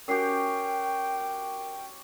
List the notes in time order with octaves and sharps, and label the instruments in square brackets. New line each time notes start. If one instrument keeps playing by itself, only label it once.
[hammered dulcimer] C#4 F#4 G4 [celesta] A#4 C7 [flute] G5